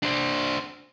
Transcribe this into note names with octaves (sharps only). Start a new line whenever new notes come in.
D4 C5